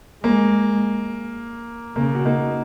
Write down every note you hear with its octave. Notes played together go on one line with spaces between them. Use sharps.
G#3 A#3
C#3 A#3
F#4
A#3 D#4